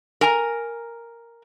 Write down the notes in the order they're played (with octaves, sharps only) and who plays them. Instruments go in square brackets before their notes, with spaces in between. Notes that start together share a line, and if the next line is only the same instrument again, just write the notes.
[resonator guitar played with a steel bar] A#4 G#5 A#5